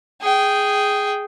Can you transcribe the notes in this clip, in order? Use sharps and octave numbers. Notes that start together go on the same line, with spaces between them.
G#4 G5